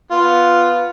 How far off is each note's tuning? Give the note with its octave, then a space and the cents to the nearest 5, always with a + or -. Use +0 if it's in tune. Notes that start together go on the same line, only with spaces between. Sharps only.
B3 +0 F4 +0